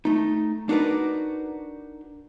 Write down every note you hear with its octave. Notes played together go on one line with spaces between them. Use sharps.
A3 D#4
D4 D#4 F#4 A#4 B4 D5